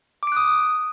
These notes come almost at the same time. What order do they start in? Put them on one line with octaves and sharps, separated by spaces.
D6 D7 F#6 D#6